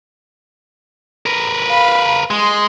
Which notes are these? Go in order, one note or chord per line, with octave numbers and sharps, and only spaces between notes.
A#4 B4
F5 B5
G#3 C6